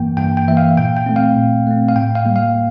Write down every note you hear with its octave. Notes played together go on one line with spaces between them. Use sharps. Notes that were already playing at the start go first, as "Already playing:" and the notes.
Already playing: G2 E3 A#3 G5
G2 G5
G5
E3 A#3 E5
F5
A#2 G5
G5
A3 C4
F5
A#2
A3 C4
F5
A2 G5
F5
G3 A#3
F5